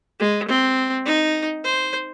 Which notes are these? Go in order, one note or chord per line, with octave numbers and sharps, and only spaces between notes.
G#3
C4
D#4
C5